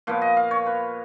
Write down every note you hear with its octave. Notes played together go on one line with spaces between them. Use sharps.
A#2 F3 B3 F5
D#5
F5
C#5
B4